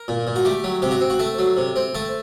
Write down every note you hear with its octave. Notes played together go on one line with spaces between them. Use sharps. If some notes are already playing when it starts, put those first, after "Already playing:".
Already playing: A#4
A#2
A#2
F#4
A3 G4
F#3
C3 G4
F#4
C4
F#4
A3 A4
F#3
C3
C4
A3 A4